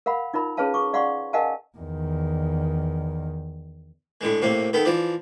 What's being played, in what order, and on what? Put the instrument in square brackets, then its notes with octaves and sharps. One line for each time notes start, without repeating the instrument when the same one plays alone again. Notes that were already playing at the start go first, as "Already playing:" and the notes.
[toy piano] A#4 F5 F#5 B5
D#4 F4 A#4 B5
C#4 G#4 B4 C#5 F5 A5
G#4 C#6 D6
D5 F5 F#5 C6 C#6
A#4 D#5 F5 F#5 G#5 A5
[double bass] E2 D#3
[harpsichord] A2 D3 G#3
A2 C3 A#3
D#3 B3 A4
E3 F3 D5